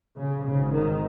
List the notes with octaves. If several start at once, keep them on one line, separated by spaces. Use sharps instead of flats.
C#3
G#1 G#2 C#3
D#3